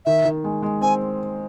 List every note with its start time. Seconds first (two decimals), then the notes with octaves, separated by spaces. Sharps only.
0.06 D#3 E5
0.25 D#3
0.44 G#3
0.63 G#3
0.81 C4 G#5